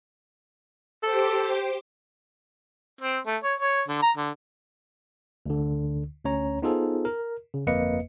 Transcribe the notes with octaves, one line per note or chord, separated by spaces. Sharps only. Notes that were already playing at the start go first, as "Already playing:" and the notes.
G4 A4 C5 D6
C4
A3
C#5
C#5
D3
A#5
D3
D2 D3
D2 C#4 C#5 A#5
B3 D#4 F4 G#4 A4 C5
A#4
C#3
G1 F2 A#3 B4 D#5 C#7